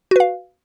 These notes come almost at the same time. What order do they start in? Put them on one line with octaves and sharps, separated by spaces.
F#4 B4 F5